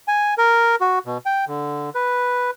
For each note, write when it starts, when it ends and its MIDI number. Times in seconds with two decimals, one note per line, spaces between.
0.08 0.34 80
0.38 0.75 70
0.81 0.99 66
1.06 1.18 47
1.26 1.45 79
1.48 1.90 50
1.95 2.51 71